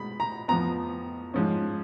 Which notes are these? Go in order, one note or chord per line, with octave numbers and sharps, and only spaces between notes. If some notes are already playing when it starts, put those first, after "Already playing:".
Already playing: B2 G#3 B3 B5
A#5
F2 F3 B3 A#5
G#2 F3 G#3 C#4